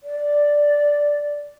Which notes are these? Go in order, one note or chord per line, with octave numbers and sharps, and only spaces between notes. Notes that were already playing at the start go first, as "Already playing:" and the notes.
D5